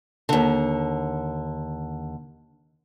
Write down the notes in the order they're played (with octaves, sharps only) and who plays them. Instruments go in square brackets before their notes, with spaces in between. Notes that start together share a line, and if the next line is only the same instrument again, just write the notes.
[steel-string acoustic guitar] D#2 D3